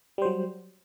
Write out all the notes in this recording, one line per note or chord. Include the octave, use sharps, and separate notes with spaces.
F#3 G3 C5